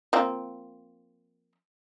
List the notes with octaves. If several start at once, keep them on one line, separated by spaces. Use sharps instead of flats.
F3 A#3 C4